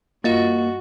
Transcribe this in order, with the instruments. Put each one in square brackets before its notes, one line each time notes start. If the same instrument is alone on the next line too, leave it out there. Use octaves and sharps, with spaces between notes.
[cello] G2 F#4 [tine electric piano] A#3 [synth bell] F4 D#5 A6